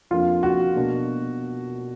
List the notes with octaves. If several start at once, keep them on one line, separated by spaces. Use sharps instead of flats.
F2 F3 A#3 D4 F4
F#4
B2 A#3 D4